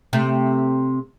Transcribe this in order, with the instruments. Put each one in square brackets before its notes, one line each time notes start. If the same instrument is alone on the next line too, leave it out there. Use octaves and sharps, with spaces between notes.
[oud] C3 A3